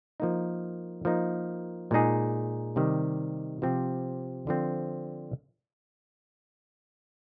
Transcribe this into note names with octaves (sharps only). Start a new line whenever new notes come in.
F3 A#3 D#4
F3 A#3 D#4
A#2 G#3 D#4 G#4
C3 D#3 G3
C3 F3 C4 G4
D3 F3 C4